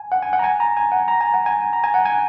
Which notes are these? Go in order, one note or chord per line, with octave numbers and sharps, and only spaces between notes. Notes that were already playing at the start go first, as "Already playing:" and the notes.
Already playing: G#5
F#5
G#5
F#5
A#5
G#5
A#5
G#5
F#5
A#5
G#5
F#5
G#5
A#5
G#5
F#5
G#5